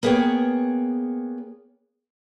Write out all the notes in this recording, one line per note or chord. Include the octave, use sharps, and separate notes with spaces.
A#3 B3 G#4 C#5 G5